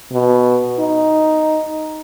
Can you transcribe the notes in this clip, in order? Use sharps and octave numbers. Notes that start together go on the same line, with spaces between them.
B2
D#4